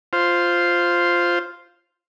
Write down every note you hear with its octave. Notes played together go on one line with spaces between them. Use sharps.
F4 C5